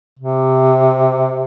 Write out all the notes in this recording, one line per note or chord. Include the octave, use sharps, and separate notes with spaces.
C3